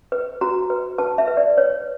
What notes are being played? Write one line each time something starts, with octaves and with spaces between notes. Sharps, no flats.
B4
F#4 A#5
B4
B4 A5
E5
B4
D5
B4 C#5